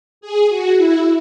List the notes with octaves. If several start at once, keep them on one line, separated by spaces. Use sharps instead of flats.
G#4
F#4
E4